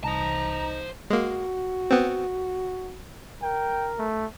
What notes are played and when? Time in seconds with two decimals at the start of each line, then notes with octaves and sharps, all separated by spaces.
0.04 C2 D#4 C5 A5 A#5
1.10 G#3 A#3 F#4
1.91 B3 C4
3.43 A#4 G5
3.99 A3